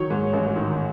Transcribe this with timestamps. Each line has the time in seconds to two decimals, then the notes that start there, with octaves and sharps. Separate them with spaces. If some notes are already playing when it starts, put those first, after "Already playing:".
Already playing: D#3 F#3 C#5 C#6
0.10 G#2
0.33 A1
0.56 D#3